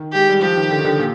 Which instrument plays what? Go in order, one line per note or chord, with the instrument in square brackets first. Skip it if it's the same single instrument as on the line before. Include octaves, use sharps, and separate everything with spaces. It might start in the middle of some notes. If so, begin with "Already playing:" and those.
Already playing: [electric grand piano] D#3
[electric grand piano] G#3 [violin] G4
[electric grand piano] G3
[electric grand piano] F3 [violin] G4
[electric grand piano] D#3
D3
D#3
D3
A#2